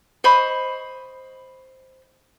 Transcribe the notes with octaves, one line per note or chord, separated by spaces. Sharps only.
C5 D#5 B5 C#6